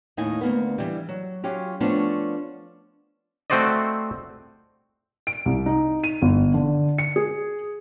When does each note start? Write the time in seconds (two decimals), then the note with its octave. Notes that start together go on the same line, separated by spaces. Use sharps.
0.17 D#2 A2 D#4 E4 F5 G#5
0.41 D2 A#3 B3
0.78 E3 G3
1.09 F#3
1.44 F#3 C#4 F4 G4
1.80 F3 A3 B3 C#4 D4 F4
3.50 A3 C4 F#4 C5 D5 D#5
5.27 D7
5.46 C2
5.66 D#4
6.04 D#7
6.22 G1
6.54 D3
6.98 C#7
7.16 G#4